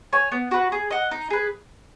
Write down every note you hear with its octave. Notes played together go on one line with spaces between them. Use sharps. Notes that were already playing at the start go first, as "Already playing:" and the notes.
C#5 G#5
B3
F#4 B4
G#4
D#5 F#5
D#4
G#4 B4